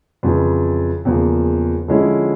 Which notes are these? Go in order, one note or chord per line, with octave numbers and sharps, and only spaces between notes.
F2 C#3 E3
E2 C#3 F3 A#3
D3 F3 G#3 C#4 E4